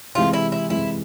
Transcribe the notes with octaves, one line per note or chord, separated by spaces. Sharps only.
C3 E3 G#3 F4
E4
E4
C3 E3 G#3 E4